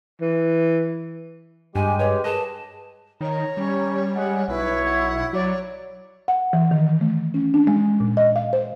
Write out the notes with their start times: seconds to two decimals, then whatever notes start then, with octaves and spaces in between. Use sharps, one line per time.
0.21 E3
1.75 G2 G#3 G4 G#5
1.99 B4 C#5 D#5
2.24 G#4 A#4 B4 D#5 A5
3.21 D#3 C#5 A#5
3.57 G3 C#4
4.15 G#3 F#5
4.48 B1 E4 B4 C#5
4.85 F#5
5.33 F#3 C#5 D5
6.28 F#5
6.53 E3
6.71 D#3
7.01 A3
7.34 C#4
7.54 D4
7.67 G#3
8.00 A#2
8.17 D#5
8.36 F5
8.53 C5